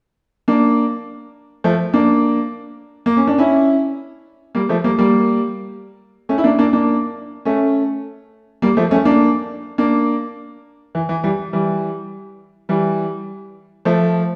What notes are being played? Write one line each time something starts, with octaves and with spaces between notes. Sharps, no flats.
A#3 D4
F3 A3
A#3 D4
A#3
C#4
D4
C#4 E4
G3 A#3
F3 A3
G3 A#3
G3 A#3
A3 C#4
E4
A#3 D4
A#3 D4
A#3 D4
A3 C#4
G3 A#3
F3 A3
A3 C#4
A#3 D4
A#3 D4
E3
E3
E3 G3
E3 G3
E3 G3
F3 A3